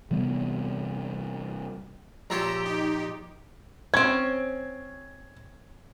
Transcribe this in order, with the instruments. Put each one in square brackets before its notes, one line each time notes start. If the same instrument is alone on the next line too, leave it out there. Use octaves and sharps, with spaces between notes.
[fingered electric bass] C3 E3 G3 B3
[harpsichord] A#1 F4 C#5 [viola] G4 [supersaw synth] A#5 E6
[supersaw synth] D#4
[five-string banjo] C4 C#4 [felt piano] G#6